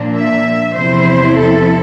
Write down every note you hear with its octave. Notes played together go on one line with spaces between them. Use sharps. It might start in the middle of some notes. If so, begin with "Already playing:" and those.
Already playing: A#2 F3 A#3 D4
E5
E2 C3 F3 C4 E4 C5
A4